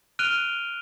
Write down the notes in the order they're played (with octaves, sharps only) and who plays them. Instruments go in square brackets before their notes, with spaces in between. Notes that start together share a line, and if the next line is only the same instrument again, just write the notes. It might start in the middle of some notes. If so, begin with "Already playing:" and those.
[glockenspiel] F6 F#6 D7 D#7 F7 G7